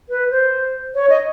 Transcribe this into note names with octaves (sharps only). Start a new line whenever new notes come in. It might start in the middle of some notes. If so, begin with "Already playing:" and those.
B4
C5
C#5
D#5